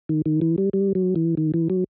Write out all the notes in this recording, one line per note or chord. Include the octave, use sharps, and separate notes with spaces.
D#3
D#3
E3
G3
G3
F#3
E3
D#3
E3
F#3